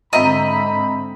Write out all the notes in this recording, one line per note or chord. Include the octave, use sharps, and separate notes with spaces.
G#2 D3 C4 D#5 E5 A#5 B5